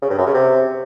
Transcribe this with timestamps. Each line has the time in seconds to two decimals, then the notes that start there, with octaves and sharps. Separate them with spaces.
0.02 C#3
0.10 G2
0.18 F#2
0.26 C#3
0.35 C3